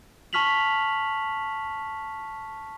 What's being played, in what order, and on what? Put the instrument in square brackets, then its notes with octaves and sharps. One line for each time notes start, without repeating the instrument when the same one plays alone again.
[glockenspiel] A5 C#6 F6 B6 F7 F#7